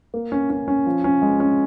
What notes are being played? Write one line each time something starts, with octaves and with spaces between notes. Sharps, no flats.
A#3
C#4
C#4
C#4
F3
C#4
G#3
C#4